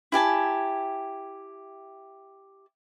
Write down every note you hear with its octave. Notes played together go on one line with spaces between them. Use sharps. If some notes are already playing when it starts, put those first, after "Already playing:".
E4 G4 G#5 A5